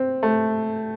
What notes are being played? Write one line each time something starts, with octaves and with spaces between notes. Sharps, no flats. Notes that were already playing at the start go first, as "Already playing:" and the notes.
Already playing: C4
A3